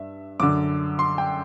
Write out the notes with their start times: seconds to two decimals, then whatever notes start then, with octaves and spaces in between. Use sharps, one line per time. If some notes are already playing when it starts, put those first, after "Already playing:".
Already playing: G2 E5
0.40 F#2 D3 D6
0.99 C6
1.18 G5